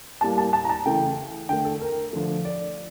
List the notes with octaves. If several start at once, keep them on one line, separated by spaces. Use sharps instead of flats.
A2 G3 A#3 A5
A5
A5
A#5
A5
C#3 E3 A3 G5
D3 A3 G5
A4
A#4
D3 F3 A3
D5